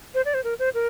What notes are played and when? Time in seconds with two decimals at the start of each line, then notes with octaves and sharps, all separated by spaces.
0.15 C5
0.25 D5
0.34 C5
0.44 A#4
0.59 C5
0.74 A#4